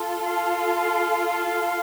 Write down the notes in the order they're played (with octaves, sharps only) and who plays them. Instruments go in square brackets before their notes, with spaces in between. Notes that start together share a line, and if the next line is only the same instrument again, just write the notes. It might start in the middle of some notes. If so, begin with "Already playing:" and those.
Already playing: [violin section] F4 A4
[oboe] F5